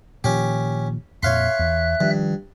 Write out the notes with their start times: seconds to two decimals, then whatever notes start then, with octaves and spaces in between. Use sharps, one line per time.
0.24 A#2 D#3 F3 C#4 G4
1.23 F2 A#2 C#5 E5 F5 C6 F#6
1.59 E2
2.00 G2 D#3 F3 G3